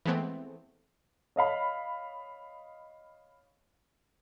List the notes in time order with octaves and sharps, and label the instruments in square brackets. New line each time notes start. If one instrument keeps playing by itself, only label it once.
[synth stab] E3 G#3 A3 B3 C4
[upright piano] C#5 D#5 F5 B5